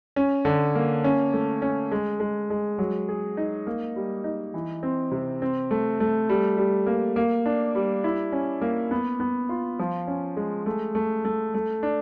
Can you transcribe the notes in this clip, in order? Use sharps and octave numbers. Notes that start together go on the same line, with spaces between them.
C#4
D3
A#3
C#4
A3
C#4
G#3
G#3
G#3
F#3
G#4
D#4
A#3
G3
D#4
E3
C4
C3
C4
A3
A3
G3
G3
A#3
A#3
D4
G3
E4
C#4
A#3
B3
B3
F4
F3
C#4
G#3
A3
A3
A3
A3
D4